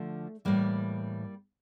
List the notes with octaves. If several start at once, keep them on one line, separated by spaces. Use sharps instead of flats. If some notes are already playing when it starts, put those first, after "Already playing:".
Already playing: D3 F3 A3
A2 E3 G3 A#3